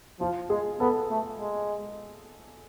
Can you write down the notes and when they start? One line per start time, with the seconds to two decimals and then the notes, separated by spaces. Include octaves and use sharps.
0.20 F3 F4
0.50 G#3 G#4
0.80 B3 A4
1.10 A3
1.40 G#3